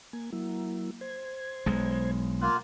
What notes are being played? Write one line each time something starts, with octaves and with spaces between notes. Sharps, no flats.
A#3 G#5
F#3 A#3 E4
C5 G#6
B1 G#3
A#3 F4 F#5 F#6